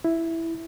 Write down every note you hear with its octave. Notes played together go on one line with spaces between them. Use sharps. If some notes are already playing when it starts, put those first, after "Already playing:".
E4